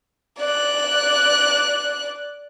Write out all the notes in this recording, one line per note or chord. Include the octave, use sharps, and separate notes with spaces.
D5 F#6